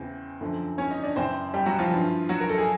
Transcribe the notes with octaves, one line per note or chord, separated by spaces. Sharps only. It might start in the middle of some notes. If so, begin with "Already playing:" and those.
Already playing: E2 C#3 E3 C4
F#2 D3 F3
C#4 C#5
D#4 D#5
D4 D5
F#2 C#3 E3 C4 C5
G3 G4
F#3 F#4
F3 F4
G2 E3
F#3 F#4
A#4
A4
G#4